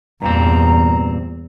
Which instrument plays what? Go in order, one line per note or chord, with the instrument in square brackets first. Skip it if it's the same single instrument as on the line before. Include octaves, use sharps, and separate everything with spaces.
[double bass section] E2 [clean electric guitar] G2 A#2 C4 [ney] A#5